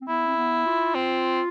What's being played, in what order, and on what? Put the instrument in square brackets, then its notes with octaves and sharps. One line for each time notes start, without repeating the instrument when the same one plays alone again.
[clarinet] C4
[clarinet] B3 [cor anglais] E4
[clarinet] C4
B3
F4
[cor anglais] C4